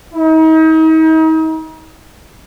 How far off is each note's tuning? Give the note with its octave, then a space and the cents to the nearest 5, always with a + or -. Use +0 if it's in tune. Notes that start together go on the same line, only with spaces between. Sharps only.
D#4 +40